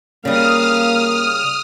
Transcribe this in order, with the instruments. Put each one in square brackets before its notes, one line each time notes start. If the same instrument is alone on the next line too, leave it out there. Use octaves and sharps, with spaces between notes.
[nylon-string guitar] C#3 G3 [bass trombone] A#3 [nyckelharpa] F5 [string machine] D#6 F6